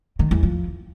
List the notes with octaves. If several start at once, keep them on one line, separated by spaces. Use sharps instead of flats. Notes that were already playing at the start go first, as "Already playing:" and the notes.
D#3
E2
F3